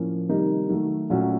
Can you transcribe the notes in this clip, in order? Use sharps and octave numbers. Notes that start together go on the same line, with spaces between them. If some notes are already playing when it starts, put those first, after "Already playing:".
Already playing: A2 F3 A#3 C#4
C3 D#3 G3 A#3 D#4
D#3 F#3 A3
A#2 F#3 A3 C#4 F#4